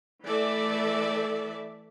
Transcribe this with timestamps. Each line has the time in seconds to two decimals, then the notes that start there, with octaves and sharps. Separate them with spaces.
0.25 E3 A3 A4 D5 E5